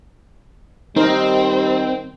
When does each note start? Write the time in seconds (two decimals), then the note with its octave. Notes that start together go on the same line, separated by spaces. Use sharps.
0.96 D#3 G3 C4 D#4 A#4 C5